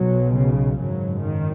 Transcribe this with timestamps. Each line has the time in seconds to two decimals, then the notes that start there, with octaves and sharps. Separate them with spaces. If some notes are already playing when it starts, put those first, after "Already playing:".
Already playing: B1 B2 F#3
0.35 C#3
0.79 G#1 F#2 C#3 F#3
1.22 D#3